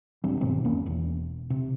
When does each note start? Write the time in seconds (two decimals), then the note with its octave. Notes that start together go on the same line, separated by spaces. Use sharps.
0.24 D#1 G3 C4 D4
0.41 G2 B2 D#3 C4
0.65 E1 B1 A#3 C#4
0.86 E1 E2
1.50 C3